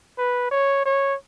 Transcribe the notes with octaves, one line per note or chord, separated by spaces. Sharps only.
B4
C#5
C#5